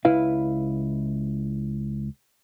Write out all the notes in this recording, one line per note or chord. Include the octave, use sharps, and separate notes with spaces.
C#2 E4 B4 F5